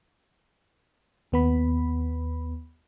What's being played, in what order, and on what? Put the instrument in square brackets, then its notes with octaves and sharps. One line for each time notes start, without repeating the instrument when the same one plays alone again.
[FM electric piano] D#2 B3 B5